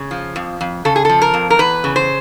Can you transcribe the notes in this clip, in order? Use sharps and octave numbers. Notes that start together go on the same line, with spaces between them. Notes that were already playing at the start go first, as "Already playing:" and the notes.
Already playing: C#3
F3
F2
F2
C#3 A4
G#4
F3 A4
A#4
F2
A#4
E2 B4
C#3
C5